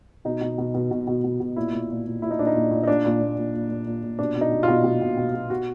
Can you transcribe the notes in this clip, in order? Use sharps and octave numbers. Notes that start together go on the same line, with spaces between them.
B2 D#4
B2
B2
B2
B2
B2
B2
B2
A#2 E4
A#2
A#2
A#2
A#2 E4
D#4
A#2 D4
D#4
A#2
A#2
D#4
A#2 D4
A#2
A#2
A#2
A#2
A#2
A#2
A#2
B2 D4
B2
D#4
B2
F4
B2
B2
B2
B2
B2
B2 F#4